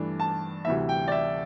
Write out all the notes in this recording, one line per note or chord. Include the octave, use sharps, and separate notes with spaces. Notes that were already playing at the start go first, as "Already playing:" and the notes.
Already playing: G2 E3 A3 D4
A5
D2 C3 E3 G3 E5
G5
D5
E5